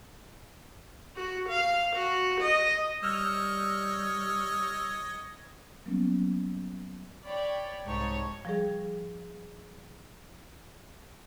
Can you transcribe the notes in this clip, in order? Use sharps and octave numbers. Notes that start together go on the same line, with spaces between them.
F#4
F5
F#4
D#5
G3 C#5 D#5 E6 F6 G6
F#3 G3 A#3 B3 C#4
C#5 D5 G5 B5
C2 G#2 G3 D#4 C#5 A5
F3 G3 G#4